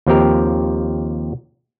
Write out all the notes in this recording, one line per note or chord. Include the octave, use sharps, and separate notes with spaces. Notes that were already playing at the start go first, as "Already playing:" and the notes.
D#2 F3 C4 G4 A#4